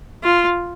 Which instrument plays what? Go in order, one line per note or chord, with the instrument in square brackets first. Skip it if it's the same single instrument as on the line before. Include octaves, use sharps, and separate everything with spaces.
[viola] F4